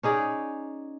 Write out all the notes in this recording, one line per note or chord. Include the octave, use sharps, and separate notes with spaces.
C#4 D#4 G#4 D5